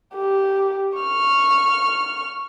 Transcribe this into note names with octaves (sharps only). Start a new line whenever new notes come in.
G4
C#6 F6